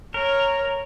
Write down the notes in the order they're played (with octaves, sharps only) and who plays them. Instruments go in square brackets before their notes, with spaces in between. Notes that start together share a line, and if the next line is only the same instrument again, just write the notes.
[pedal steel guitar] A#4 [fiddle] C#5